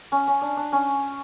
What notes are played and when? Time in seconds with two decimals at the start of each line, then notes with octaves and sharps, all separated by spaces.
0.12 C#4
0.28 C#4
0.42 D4
0.57 D4
0.72 C#4